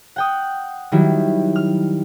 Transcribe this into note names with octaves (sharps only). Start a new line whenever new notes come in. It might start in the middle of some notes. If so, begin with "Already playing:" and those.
F#5 G5 D#6
D#3 F#3 G3 E4
F6